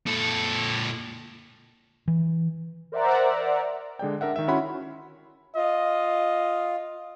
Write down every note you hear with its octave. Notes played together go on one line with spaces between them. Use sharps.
A#2 A4
E3
A#4 C5 D5 E5 F#5 A#5
D3 G#3 D5 G5
D4 A#4 E5 F#5
D#3 E5
C#4 E4 F#4 F#5 B5 C6
F4 D#5